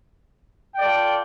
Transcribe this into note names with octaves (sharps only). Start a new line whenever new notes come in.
F4 A4 D5 G5